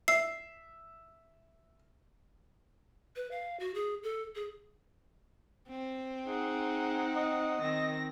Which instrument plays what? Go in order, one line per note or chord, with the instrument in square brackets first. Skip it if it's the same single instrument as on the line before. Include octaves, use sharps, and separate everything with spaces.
[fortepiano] E5 [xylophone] C7
[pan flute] B4
F5
F#4
G#4
A4
G#4
[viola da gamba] C4
[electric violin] D#4 F#5 [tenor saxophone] G#4
[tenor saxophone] D#5
[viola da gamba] D#3 [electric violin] C4 A#6